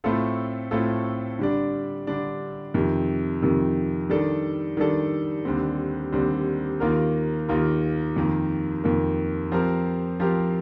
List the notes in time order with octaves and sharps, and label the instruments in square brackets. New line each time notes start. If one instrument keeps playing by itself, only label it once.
[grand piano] A2 A3 C4 F4 A4
A2 A3 C4 F4 A4
D3 G3 D4
D3 G3 D4
F2 C3 D#3
F2 C3 D#3
D#3 G3 D4 A4
D#3 G3 D4 A4
D#2 D3 G3 C4
D#2 D3 G3 C4
D#2 D#3 A#3 F4 A#4
D#2 D#3 A#3 F4 A#4
F2 D#3 A#3
F2 D#3 A#3
F3 C4 G4 A#4
F3 C4 G4 A#4